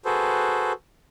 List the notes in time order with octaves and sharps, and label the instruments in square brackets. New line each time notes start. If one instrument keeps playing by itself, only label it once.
[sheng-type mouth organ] F#4 G#4 A4 B4 C5